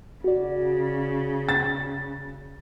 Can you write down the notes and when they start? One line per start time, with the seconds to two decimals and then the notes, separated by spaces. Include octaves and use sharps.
0.24 C#3 F#4 D5
1.49 A6